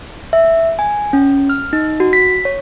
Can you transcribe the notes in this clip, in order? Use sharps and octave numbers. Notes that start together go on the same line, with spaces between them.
E5
G#5
C#4
F6
D#4
F#4
B6
C#5